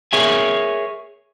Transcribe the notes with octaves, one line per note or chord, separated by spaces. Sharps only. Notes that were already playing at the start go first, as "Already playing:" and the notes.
G#4 A#4 C#5 E5 G#5